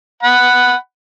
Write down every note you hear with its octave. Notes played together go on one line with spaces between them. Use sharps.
F#5 B5